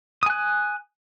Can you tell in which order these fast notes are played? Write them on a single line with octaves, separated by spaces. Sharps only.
D#6 G#5 F#6